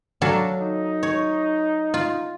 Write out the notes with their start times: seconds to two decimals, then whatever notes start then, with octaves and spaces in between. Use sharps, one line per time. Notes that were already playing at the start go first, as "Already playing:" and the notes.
0.22 F#3 D4 A4 F5
0.60 D#4
1.03 C#5
1.94 F4